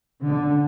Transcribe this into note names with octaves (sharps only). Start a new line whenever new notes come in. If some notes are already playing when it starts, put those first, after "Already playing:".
D3